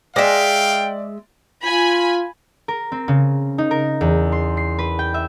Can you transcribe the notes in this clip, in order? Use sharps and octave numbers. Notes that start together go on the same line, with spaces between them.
G#3 D5 E5 F5 G5
F4 G#5 B5
A#4
C4
C#3
D#4
A#4
E2
C6
C7
B4
G5
E5